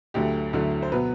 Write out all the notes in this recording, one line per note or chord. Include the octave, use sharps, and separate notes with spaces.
D2 D3 F#3 A3 G4
D2 D3 F#3 A3
C5
B2 F#3 B3 B4